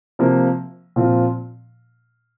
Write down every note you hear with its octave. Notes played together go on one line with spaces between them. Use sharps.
C3 F3 A#3
A#2 F3 C4 F4